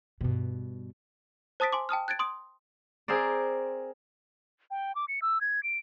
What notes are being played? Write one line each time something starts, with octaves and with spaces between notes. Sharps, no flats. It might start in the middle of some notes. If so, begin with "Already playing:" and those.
G2 B2
C5 A5 D#6 A6 B6 D7
G#5 C6 D6
G5 A5 D#6 F6
F#6 G#6 A6 D7
C6 D#6 D7
C4 G#4 A#4 C5 D5
G5
D6
C#7
E6
G#6
D7